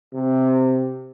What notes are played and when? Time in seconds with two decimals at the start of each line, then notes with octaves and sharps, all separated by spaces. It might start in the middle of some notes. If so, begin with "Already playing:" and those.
0.13 C3